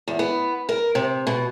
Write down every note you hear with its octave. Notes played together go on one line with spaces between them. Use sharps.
E2
B3
A#4
C3
B2